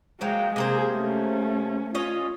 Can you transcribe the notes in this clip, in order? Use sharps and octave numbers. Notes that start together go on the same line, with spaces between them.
F3 F#3 G#3 A#3 G5
C3 A#3 G#4 C5
A3 C#4
C#4 F4 C#5 D#5